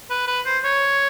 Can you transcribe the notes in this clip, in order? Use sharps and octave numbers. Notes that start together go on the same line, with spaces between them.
B4
B4
C5
C#5